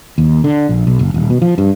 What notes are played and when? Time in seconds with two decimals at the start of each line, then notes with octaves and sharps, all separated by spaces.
0.18 D#2
0.44 D3
0.69 A#1
0.87 B1
0.99 F#1
1.14 D#1
1.30 B2
1.42 F3
1.58 G2